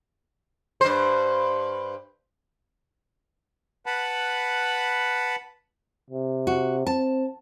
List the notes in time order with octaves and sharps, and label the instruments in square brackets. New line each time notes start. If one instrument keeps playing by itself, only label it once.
[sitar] G2 C5
[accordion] B4 F#5 A5 B5
[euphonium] C3
[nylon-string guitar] F#4
[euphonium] C4 [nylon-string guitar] A5